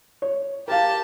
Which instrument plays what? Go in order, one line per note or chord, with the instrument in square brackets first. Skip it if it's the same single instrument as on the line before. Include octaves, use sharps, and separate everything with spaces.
[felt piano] C#5
[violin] G4 A5 [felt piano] A#4 F5